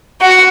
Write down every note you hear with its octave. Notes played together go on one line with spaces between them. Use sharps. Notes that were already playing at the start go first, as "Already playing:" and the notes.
F#4